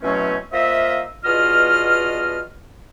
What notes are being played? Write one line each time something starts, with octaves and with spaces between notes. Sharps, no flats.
B2 E3 F#3 A3 C4 C#4
A#3 F4 C5 D#5 E5
E2 B2 F4 D#5 F6